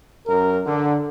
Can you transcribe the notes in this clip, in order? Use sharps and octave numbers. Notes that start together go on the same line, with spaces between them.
F#2 A#4
D3